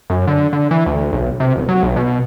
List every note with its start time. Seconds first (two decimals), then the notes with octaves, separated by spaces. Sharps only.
0.10 F#2
0.27 D3
0.53 D3
0.71 E3
0.86 D2
1.13 B1
1.40 C3
1.56 D1
1.69 F#3
1.83 B1
1.96 B2